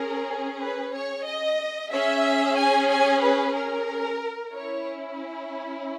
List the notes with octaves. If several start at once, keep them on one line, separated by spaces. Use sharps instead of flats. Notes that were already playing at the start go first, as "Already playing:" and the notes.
Already playing: C#4 G#4 A#4
B4
C#5
D#5
C#4 G#4 E5
G#5
G#5
B4
A#4
C#4 E4 C#5